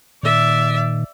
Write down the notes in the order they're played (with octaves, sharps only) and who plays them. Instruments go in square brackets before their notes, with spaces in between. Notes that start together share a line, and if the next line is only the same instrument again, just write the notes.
[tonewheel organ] A#2 D#3 [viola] D5 E5